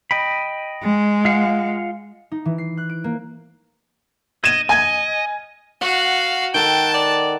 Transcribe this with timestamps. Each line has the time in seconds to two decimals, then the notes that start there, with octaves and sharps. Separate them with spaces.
0.11 D#5 G5 B5
0.83 G#3
1.25 F4 F5 F#5
2.32 D#4
2.45 E3
2.58 C7
2.77 F#6
2.89 D7
3.04 A#3
4.44 D#5 G#6 D#7 E7
4.69 D#5 G#5 G#6
5.81 F#4 F5 F#5
6.54 D#3 A4 F#5 G5 A5
6.94 D5